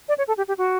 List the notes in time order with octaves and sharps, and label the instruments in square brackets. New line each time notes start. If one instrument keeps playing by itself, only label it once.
[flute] D5
C#5
A4
G4
G4
F#4